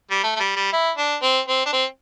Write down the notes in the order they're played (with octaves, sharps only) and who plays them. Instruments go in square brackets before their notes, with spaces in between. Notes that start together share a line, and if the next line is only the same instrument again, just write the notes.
[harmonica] G3
A3
A3
G3
G3
E4
D4
C4
C4
D4
C4